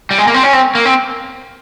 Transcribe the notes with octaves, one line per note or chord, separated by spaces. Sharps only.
G3
G#3
A#3
C4
C#4
C4
A#3
C4